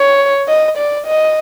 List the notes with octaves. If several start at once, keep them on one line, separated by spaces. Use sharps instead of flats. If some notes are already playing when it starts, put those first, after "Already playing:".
Already playing: C#5
D#5
D5
D#5